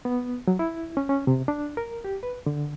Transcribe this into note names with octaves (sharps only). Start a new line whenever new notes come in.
B3
F#3
E4
C#4
C#4
C3
D4
A#4
G4
B4
D3